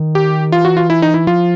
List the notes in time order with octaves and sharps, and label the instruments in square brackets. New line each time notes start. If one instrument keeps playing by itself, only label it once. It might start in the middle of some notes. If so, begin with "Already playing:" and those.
Already playing: [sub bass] D#3
[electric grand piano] G4
[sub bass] E3 [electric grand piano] F4
[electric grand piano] F#4
F4
E4
D#4
E4
[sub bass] F3 [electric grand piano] F4